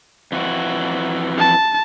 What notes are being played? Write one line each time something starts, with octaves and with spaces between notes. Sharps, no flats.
F2 E3 F#4
A5